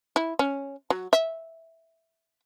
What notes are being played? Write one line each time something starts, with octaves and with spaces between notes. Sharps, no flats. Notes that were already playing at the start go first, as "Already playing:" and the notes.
E4
C#4
F#3
E5